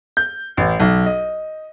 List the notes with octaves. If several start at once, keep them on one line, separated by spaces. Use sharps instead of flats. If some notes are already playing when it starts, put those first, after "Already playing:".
G6
A1
B1
D#5